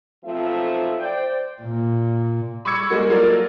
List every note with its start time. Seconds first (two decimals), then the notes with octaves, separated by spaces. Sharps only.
0.25 B1 F3 A3 C4 F4 E5
1.00 C5 D5 G5
1.63 A#2
2.65 B5 C#6 D6 E6 G#6 C#7
2.90 G3 G#3 A#3 F#4
3.10 F#3 A#3 F4 A4 A#4 D5